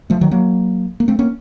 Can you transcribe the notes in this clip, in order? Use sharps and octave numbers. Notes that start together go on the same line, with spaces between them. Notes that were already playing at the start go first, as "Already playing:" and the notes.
F3 A3
D#3 F#3
F#3 A#3
A#3
A3 C4
A#3 C#4